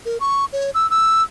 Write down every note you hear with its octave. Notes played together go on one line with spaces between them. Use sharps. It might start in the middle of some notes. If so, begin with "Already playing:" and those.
A#4
C#6
C#5
E6
E6